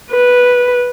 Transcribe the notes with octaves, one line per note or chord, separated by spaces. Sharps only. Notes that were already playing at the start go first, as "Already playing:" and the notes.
B4